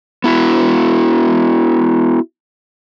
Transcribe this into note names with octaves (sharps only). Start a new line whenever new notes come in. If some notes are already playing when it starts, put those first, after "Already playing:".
B3 E4 F#4